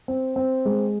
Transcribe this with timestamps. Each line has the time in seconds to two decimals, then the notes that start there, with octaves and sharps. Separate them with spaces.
0.08 C4
0.36 C4
0.65 G#3